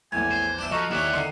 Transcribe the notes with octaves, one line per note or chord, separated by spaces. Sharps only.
A#1 E2 A2 G#5 G#6
C5
D4 D5 E5
F3 F#4 A4 D#5 A#5 C#6
D#2 D#3 C#4 E4 D5 F#5
D3 D#3 C6 C7 D#7